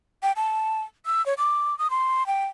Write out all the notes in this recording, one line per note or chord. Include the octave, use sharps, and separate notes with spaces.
G5
A5
E6
C#5
D6
D#6
C6
G5